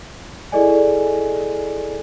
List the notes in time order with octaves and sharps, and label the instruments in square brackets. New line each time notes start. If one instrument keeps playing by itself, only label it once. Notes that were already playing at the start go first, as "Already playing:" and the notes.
[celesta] E4 G#4 A4 D5 D#5 G#5